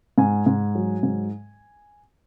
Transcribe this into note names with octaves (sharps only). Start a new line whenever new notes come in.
G#2 G#5
G#2
F#3
G#2